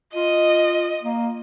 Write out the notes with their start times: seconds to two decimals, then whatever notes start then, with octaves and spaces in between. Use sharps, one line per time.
0.14 F4 D#5
1.03 A#3